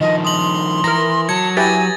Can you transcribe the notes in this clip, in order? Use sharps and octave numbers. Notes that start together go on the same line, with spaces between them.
D#3 F3 D#5
C6 D#6 F#7
E3 A#4 A#5 A#6
F#3 A5 G#6 C#7
E4 G4 B4 G#5 A6 A#6